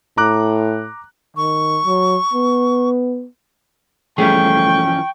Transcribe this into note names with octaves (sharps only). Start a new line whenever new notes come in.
A2 A#5 D6 F#6
D#3 C#6
F#3
B3
E3 F3 G3 A3 C#4 G#4 G5 C#6